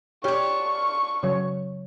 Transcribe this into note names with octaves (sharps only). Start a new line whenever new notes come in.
D4 F4 G4 C#5 C#6
C#3 F#3 C#5